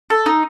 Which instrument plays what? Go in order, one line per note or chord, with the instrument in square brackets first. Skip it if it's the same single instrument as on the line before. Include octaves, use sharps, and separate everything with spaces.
[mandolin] A4
D#4